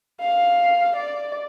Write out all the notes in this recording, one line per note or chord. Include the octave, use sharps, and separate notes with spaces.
F5
D5